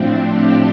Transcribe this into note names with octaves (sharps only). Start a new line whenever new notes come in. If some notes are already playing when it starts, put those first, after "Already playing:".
Already playing: A2 F3 A3 C4 D4
D4 G4